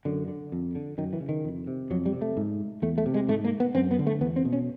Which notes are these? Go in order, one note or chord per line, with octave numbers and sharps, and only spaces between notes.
F#2 D3
D3
F2
D3
F#2 D#3
E3
C#3
D#3
F2
C3
F2 F#3
G3
C3
A3
G#2
E2 A3
A3
C3
G#3
G#2 A3
A#3
B3
F#2 C4
B3
D3
A3
E2 B3
C4
B2
C#4